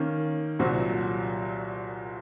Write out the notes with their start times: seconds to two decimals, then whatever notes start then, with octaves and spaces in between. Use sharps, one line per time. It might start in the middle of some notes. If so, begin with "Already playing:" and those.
Already playing: D#3 A#3 C#4
0.59 C2 A#2 F#3 C4 F#4